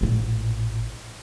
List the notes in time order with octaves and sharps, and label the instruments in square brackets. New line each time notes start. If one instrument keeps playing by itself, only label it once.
[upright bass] A1 A#2